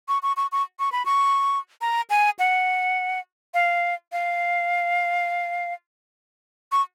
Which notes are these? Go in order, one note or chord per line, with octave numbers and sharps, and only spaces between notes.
C#6
C#6
C#6
C#6
C#6
B5
C#6
A#5
G#5
F#5
F5
F5
C#6